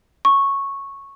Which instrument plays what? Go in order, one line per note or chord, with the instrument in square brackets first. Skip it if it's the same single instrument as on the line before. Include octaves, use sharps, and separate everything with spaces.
[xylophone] C#6